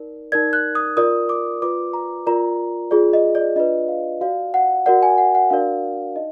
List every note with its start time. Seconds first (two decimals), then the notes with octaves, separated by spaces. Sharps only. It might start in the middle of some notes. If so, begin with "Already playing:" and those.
Already playing: D#4 A#4 D5
0.32 D#4 A#4 D5 G#6
0.53 F#6
0.75 D#6
0.97 F4 A#4 D5 D#6
1.29 D6
1.61 F4 B4 D5 D6
1.93 A#5
2.26 F4 A#4 D5 A#5
2.91 F4 G#4 D5
3.13 D#5
3.35 D5
3.56 D4 F4 B4 D5 D#5
3.89 F5
4.21 F#4 D5 F5
4.54 F#5
4.86 F#4 A#4 D5 F#5
5.03 G#5
5.18 F#5
5.35 F#5
5.50 D4 F#4 A#4 D5 F5
6.16 D#4 D#5